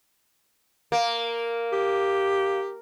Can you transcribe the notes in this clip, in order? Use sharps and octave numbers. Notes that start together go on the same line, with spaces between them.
A#3
G4